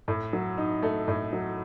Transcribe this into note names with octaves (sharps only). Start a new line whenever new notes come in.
A2
F#3
D#4
A3
A2
F#3